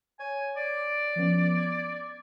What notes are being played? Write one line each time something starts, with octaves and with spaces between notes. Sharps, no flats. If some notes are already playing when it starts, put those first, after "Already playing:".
C#5 G#5
D5
F3 B3 C#4
G#6